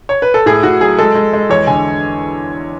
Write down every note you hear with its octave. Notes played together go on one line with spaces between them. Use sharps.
C#5
B4
A4
A2 G#4
A2 F#4
F#3 G#4
G#3 A4
G#3
G#3
E2 C#5
D3 G#5